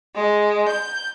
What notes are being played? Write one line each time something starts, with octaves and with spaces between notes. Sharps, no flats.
G#3
G6